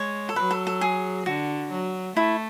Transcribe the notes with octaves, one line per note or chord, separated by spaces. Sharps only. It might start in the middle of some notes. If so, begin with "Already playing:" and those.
Already playing: G#3 C#5
A4
F#3 B4
A4
A4
G#4
D3 F#4
F#3
A3 E4